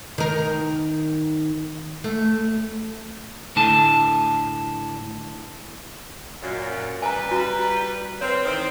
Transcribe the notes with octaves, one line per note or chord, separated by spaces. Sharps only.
D#3 A#4
A3
A2 D3 D4 G#5 A5
F#2 A#2
G3 B4 G#5 A#5
F#4 A#5
C4 B4 C#5
D#3 E3 C4